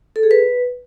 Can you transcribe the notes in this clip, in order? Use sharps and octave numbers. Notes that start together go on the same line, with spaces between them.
A4
G#4
B4